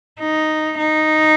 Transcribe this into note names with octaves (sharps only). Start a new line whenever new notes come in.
D#4
D#4